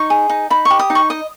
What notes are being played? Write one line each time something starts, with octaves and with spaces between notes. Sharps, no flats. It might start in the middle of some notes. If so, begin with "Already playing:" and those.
Already playing: D#4 C#6
G#4
D#4
D#4 B5
C#6
G4
D#6
D#4
C#6
D#5 D#6